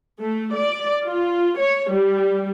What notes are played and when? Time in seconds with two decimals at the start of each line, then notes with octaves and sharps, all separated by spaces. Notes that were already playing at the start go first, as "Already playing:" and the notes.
0.21 A3
0.56 D5
1.05 F4
1.59 C#5
1.93 G3